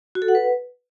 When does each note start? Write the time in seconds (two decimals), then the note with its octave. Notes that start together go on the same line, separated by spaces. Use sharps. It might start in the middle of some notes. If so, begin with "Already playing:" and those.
0.15 F#4
0.22 A4
0.28 F#5
0.35 B4